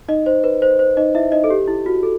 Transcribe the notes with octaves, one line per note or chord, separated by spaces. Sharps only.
D#4 D#5
C5
B4
C5
C5
D#4 D#5
E4 E5
D#4 D#5
A4
G4
E4
F#4
A4